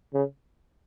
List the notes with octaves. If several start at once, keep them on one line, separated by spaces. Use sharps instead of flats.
C#3